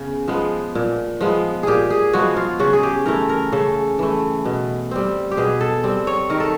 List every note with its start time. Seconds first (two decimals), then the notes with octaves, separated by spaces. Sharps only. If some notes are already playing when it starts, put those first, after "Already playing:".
Already playing: C#3 B3
0.28 F3 G#3 B3
0.75 A#2
1.21 F3 G#3 B3
1.63 A#2 G4 G#4
1.90 G#4
2.13 F3 G#3 B3 F#4
2.36 F4
2.59 C#3 F#4
2.73 G#4
2.83 G4
3.06 E3 A3 A#4
3.29 A#4
3.52 C#3 A4
3.99 E3 A3
4.45 B2
4.91 G3 C4
5.31 G4
5.37 B2 G#4
5.61 A4
5.84 G3 C4
6.07 C#5
6.30 D#3 A#4
6.40 A4